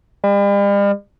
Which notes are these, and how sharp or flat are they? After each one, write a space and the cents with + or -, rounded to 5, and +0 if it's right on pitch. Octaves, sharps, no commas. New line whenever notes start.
G3 +45